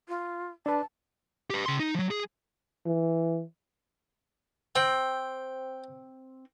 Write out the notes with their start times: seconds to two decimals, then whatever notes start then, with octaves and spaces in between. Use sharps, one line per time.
0.09 F4
0.66 D4 B4 A5
1.50 G4 B4
1.66 C#3 C6
1.80 D#4
1.95 F3 F#3
2.11 G#4
2.86 E3
4.75 C4 G5